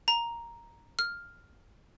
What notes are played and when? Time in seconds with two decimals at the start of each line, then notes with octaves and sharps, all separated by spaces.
0.08 A#5
0.99 F6